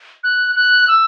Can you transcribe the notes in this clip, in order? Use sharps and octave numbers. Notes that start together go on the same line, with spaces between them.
F#6
F#6
E6